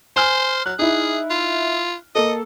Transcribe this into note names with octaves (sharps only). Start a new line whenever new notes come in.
C5 G#5 F6
F#3 F#6
D#4 E4 G#4
F4
A#3 A4 D#5